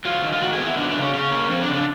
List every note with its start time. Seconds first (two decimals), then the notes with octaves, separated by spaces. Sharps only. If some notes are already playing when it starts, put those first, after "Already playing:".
0.05 F#3 F4
0.23 D#3
0.33 F4
0.41 D#3 F#4
0.53 G#4
0.59 B3
0.65 E4
0.77 F#3 D4
0.90 D4
0.95 C#3
1.01 C#4
1.14 C#3 C#4
1.31 A#3
1.49 F3 C4
1.62 D4
1.68 C#3
1.73 D4